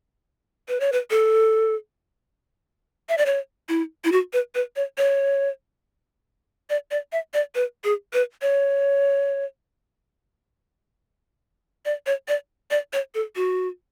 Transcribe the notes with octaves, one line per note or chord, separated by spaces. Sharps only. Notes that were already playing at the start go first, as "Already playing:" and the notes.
B4
C#5
B4
A4
E5
D5
C#5
E4
E4
F#4
B4
B4
C#5
C#5
D5
D5
E5
D5
B4
G#4
B4
C#5
D5
C#5
D5
D5
C#5
A4
F#4